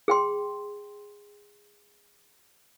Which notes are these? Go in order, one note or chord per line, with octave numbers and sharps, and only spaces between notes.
G#4 G5 C6